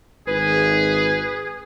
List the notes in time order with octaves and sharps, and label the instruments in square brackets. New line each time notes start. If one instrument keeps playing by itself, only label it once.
[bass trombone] G#1 [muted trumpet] G#4 [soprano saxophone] B4